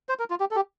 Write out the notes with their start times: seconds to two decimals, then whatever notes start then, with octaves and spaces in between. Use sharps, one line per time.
0.09 C5
0.19 A#4
0.30 F4
0.40 G4
0.51 A4
0.56 G4